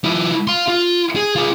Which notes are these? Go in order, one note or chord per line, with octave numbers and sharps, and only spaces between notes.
F3 E4
F5 C6
F4
G#4
F4 G#4